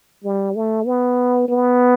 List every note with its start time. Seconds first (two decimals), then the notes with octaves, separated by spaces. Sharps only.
0.24 G3
0.56 A3
0.87 B3
1.48 B3